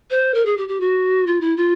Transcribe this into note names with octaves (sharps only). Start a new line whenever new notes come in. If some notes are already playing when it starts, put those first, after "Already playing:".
C5
A#4
G#4
G4
G4
F#4
F4
E4
F4